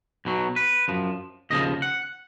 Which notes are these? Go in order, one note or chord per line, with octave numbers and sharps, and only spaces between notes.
B1 B2 F#3
B4
F#2 F3
D#2 C#3 F3 D#5
F#5